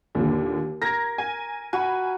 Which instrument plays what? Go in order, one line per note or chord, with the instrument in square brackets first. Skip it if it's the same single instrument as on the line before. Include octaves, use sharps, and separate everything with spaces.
[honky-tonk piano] D#2 A#2 D3
[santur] A#4 [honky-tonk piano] G#6 A#6
[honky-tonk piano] G#5
[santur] F#4 [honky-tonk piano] G#5 B5